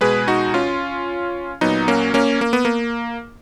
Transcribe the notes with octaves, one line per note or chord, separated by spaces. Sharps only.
B2 G#3 G#4 B4
D#4 F#4
C#4 F4
A#2 F#3 B3 D#4
A#3 C#4
A#3 C#4
A#3
B3
A#3